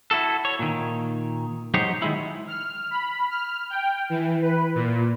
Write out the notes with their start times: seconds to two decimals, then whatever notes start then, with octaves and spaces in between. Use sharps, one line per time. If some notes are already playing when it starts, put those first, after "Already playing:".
0.11 E4 F#4 A4
0.45 C#5
0.59 A#2 D#3
1.74 F#3 G#3 D#4 G4 C5 C#5
2.02 D#3 G#3 E4
2.48 F6
2.91 B5
3.30 F6
3.70 G5
4.10 E3
4.42 B4
4.75 A#2